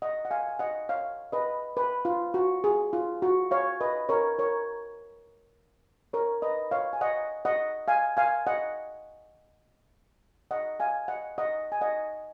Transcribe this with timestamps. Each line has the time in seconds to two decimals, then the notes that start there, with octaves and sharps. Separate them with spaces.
0.02 D#5 F#5
0.25 F#5
0.31 F5 G#5
0.49 G#5
0.59 D#5 F#5
0.89 C#5 F5
1.32 B4 D#5
1.77 B4
2.05 F4
2.34 F#4
2.64 G#4
2.93 F4
3.22 F#4
3.51 C#5 F5
3.81 B4 D#5
4.09 A#4 C#5
4.39 A#4 C#5
6.13 A#4 C#5
6.42 B4 D#5
6.71 C#5 F5
6.93 G#5
7.01 D#5 F#5
7.45 D#5 F#5
7.88 F5 G#5
8.17 F5 G#5
8.47 D#5 F#5
10.51 D#5 F#5
10.80 F5 G#5
11.08 D#5 F#5
11.38 D#5 F#5
11.72 G#5
11.81 D#5 F#5